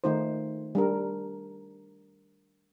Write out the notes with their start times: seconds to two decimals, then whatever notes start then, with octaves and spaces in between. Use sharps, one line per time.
0.04 D#3 A3 D#4 F4 C5
0.75 G3 D4 A#4